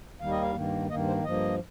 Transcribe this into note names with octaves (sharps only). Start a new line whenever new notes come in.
D#2 D#3 G3 A#3 F5
D#5
F5
G2 D#3 A#3
G2 D#3 A#3 D#5
C5
G2 F3 A#3 D#5